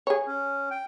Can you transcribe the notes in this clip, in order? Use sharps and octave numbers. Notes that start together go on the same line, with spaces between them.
G#4 C#5
C#4
G5